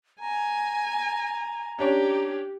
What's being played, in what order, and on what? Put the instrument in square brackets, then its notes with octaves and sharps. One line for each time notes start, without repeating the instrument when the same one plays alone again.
[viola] G#5 [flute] A#5
[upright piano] C#4 D4 C#5 [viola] G4